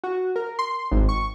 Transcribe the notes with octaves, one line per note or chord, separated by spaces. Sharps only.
F#4
A#4
C6
G#1
C#6